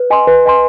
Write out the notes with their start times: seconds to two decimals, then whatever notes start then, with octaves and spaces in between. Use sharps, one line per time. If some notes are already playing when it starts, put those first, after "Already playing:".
Already playing: B4
0.10 D#5 G#5 C6
0.27 B4
0.46 D#5 G#5 C6